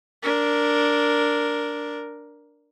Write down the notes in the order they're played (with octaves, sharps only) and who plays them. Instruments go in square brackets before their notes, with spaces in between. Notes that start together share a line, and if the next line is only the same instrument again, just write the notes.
[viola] D4 A#4